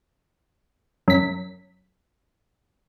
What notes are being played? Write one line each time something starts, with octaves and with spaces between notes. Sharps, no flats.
F#2 B6